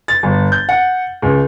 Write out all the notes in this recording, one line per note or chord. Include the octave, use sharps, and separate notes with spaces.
A6
G1
G6
F#5
C#2